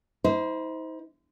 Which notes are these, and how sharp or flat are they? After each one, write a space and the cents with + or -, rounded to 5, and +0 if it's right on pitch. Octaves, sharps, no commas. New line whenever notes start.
D#4 +45 C5 -20